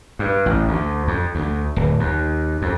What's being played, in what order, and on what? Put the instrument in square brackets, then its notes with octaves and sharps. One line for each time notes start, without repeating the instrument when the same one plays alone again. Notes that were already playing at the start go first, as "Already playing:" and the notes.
[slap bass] G2
A1
D2
F2
D2
D1
D#2
F2